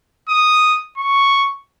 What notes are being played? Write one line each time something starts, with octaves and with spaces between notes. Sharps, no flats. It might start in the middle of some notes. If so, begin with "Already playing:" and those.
D#6
C#6